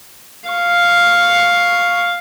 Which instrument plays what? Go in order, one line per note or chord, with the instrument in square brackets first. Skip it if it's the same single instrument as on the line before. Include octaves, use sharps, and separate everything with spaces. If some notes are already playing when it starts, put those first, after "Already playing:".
[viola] F5 C#6